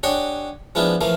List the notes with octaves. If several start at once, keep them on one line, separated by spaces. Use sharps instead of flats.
D4 G4 C#5 D#5 F#5 G#5
F3 G#3 B3 D4 E4 F4
E3 F3 A3 A#3 F5